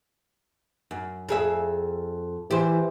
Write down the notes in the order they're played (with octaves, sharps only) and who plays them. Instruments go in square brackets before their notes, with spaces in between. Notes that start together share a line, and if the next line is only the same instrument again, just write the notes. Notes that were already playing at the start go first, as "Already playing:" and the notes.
[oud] F#2
F2 G#4 E5
[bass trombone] E3 [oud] G4 C5